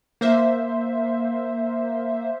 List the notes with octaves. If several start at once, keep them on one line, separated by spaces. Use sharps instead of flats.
A#3 C5 E5